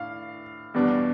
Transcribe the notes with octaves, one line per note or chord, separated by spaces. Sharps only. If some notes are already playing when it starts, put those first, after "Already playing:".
Already playing: A2 D4 F5
E2 B2 G3 B3 D4